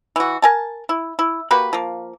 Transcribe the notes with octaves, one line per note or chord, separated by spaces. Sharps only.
E3 F#4
A#4 G#5 A5
E4
E4
A#3 F#4 G4 B4
F3 A#3